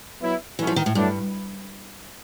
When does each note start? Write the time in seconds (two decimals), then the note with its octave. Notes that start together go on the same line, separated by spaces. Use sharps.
0.21 F#3 B3 E4
0.58 E3 F#3 A3 C#4
0.67 F3
0.76 D#3
0.86 A2
0.95 G2 F#3 A3 D4